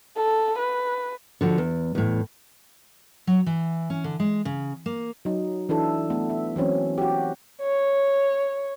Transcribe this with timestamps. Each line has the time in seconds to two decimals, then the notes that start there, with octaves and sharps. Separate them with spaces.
0.17 A4
0.59 B4
1.41 D3 F3 F#4
1.58 E2
1.95 E2 A2
3.27 F#3
3.46 E3
3.90 C#4
4.04 D3
4.20 G#3
4.45 C#3
4.86 A#3
5.25 F#3 D#4
5.69 E3 D4 E4 A4
6.10 A3 B3
6.30 E5
6.56 E3 F#3 C4 C#4
6.98 F#4 G4
7.62 C#5